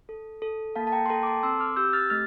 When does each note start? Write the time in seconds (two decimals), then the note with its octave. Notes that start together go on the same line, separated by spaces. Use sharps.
0.09 A4
0.42 A4
0.75 A#3 F5 A5
0.87 A5
0.92 G5 A#5
1.06 C6
1.10 A4 G5 A#5
1.23 D6
1.27 A5 C6
1.43 C4 C6 E6
1.60 D6 F6
1.76 G4 E6 G6
1.93 F6 A6
2.10 A3 F6 A6